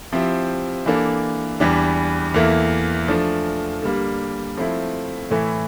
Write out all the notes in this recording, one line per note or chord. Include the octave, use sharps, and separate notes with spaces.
F3 C4 E4 G4
E3 A#3 D4 A4
E2 E3 G3 D4 G4
E2 E3 A#3 E4 A4
F3 A3 D4
D3 G3 A#3
F3 A3 C4 E4
A2 E3 A3 E4 A4